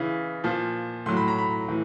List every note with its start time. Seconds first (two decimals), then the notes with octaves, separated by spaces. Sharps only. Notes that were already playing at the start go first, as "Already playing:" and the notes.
Already playing: C#3 E3
0.44 A#2 F3
1.06 A2 F#3 C6
1.17 B5
1.28 A#5
1.38 B5
1.68 A2 E3